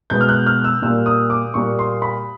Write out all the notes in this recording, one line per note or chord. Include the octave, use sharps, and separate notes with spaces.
B2 G#3 B3 G6
F6
F#6
F6
E6
A#2 G3 A#3 E6
D#6
D6
A#2 G3 A#3 C#6
C6
B5